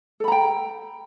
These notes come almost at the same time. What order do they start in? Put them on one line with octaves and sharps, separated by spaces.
A4 B5 A#5 G5